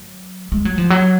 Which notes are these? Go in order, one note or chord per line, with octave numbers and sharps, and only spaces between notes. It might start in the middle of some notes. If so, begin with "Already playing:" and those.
Already playing: F#3
G#3
F#3
F3
F#3